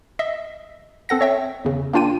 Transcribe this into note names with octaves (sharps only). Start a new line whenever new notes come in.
D#5 E5
C4 A4 F#5 A#6
C#5 E5 G5
E2 C#3
A#3 D4 F4 G5 D#7